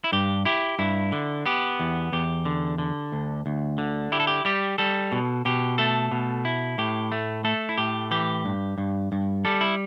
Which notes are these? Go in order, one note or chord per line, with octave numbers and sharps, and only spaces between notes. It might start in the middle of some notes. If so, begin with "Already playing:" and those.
E4
G2 G4
E4 G4
G2 E4
D3
B3 G4
E2
E2 G4
D3
D3
D2
D2
D3
E4 G4
A4
G4
G3 G4
G3 A4
B2
B2 G4
A3 A4
B2
E4
A2 G4
A3
A3 A4
E4
A2 G4
E3 G4
G2
G2
G2
G3 A4
E4